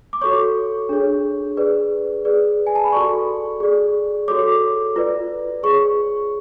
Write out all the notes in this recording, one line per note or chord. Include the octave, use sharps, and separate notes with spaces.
D6
F#4 A4 C#5 C#6
D4 G#4 C#5
G#4 B4 D5
G#4 B4 D5
G#5
A5
B5
F#4 A4 D5 C#6
G#4 D5
F#4 A4 C#5 D6
F4 B4 D5
G#4 C#5 C#6